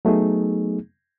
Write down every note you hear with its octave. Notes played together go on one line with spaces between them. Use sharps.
F#3 A3 B3 D#4 G#4